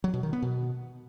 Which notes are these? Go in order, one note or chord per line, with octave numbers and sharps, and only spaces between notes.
F#3
B2
D#3
B3
B2